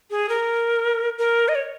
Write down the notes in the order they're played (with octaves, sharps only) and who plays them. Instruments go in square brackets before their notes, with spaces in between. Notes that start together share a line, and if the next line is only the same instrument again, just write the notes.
[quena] G#4
A#4
A#4
D#5
C#5